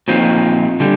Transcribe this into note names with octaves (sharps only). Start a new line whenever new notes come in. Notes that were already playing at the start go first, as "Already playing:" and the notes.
A#2 F3 C4 D#4
D3 G3